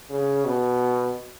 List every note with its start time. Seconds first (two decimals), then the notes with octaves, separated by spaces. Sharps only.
0.10 C#3
0.45 B2